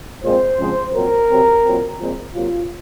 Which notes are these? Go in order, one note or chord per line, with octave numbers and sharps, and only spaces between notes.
A#2 G#3 C4 C5
C#3 F3 G#3 C4
A#2 F#3 C4 A#4
C3 F#3 C4
A#2 F#3 C4
A#2 F3 G#3 C4
C3 F#3 A#3 F4